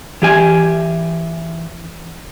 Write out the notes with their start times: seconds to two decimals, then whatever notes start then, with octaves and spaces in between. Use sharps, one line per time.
0.22 E3 G4 G#5